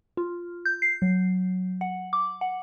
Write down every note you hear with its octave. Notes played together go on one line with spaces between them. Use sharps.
F4
G6
C7
F#3
F#5
D6
F#5